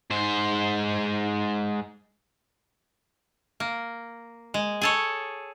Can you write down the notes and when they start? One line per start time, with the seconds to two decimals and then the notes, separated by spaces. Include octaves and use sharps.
0.11 G#2 C5
3.60 A#3
4.54 G#3
4.81 G#4 A4 C#5